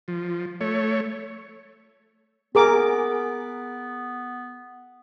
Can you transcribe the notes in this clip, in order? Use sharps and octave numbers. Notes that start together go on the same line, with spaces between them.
F3
A3 C#5
B3 G#4 A#4 D6